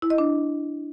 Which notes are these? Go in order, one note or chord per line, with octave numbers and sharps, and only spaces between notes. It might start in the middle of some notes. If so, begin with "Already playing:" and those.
E4
D#5
D4